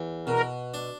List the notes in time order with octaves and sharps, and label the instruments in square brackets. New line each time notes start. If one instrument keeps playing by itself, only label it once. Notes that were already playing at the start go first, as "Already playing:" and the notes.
Already playing: [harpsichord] E2
[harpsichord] B2 [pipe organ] A#4
[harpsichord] D4